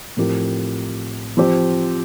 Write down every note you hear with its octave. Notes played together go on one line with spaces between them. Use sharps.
A2 F3 C4 G4 A#4
F3 C4 G4 C5